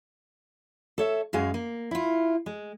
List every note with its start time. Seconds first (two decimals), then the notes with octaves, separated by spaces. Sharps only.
0.98 A4 C#5 E5
1.33 F#2 F#3 G#3 G#4 F5
1.54 A#3
1.91 E4 F4
2.46 G#3